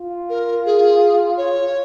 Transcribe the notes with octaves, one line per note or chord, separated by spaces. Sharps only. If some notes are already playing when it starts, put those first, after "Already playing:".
Already playing: F4
A#4
G#4
C#5